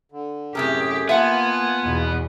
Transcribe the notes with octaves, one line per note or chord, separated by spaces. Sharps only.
D3
F#2 A2 C3 G4 G#4 A#4
A#3 B3 F4 E5 F#5 G#5 A5
E2 B2